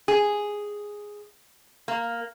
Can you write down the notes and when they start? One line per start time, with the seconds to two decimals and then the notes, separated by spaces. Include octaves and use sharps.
0.08 G#4
1.88 A#3